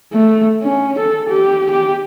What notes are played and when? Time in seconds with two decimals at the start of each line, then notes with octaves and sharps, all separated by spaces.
0.13 A3
0.62 C#4
0.99 A4
1.29 G4
1.71 G4